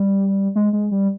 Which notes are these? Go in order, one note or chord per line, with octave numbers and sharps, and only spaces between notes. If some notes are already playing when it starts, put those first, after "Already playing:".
Already playing: G3
G#3
G#3
G3